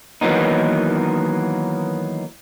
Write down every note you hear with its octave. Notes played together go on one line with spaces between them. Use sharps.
D#3 E3 F#3 A#3 B3 D#4